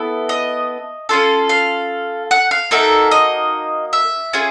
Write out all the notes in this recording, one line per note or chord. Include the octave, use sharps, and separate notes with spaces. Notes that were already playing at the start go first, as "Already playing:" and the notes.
Already playing: B3 E4 A4
D#5
C#4 F4 A4
F5
F#5
F5
A#3 D#4 F#4 A4 E5
D#5
E5
C#4 F4 G#4